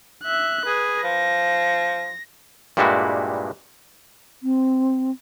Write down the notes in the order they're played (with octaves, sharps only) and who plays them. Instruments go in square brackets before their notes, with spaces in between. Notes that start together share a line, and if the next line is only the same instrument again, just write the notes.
[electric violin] E5 F#6
[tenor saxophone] G#4 [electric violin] B4
[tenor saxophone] F3 [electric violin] A#6
[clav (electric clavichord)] G2 A#2 G3 G#3 E4 F#4
[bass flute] C4